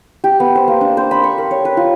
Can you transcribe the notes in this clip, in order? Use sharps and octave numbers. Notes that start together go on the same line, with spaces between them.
G4
B3
C5
A#3
D4
C5
B5
C#6
A#4
C#5
B4
F4